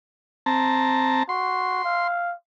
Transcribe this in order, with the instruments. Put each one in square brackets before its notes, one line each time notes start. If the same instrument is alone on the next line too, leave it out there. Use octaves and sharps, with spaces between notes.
[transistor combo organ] C4 A5 A#5
[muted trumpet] F#4 [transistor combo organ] C6
[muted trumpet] F5